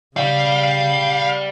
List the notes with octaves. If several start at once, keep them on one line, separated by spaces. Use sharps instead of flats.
C#3 G3 F5